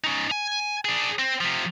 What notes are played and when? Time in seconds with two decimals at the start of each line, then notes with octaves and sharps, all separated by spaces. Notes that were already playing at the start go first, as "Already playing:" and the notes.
0.04 C#4 D#4
0.31 G#5
0.85 D4 G#4
1.19 C4
1.41 C3 F3